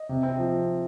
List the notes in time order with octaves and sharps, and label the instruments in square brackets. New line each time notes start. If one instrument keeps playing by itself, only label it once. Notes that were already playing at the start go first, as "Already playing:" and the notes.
Already playing: [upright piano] D#5
[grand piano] C3
C4
F3